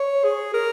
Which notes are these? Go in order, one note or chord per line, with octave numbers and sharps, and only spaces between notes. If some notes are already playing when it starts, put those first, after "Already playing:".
Already playing: C#5
G#4
A#4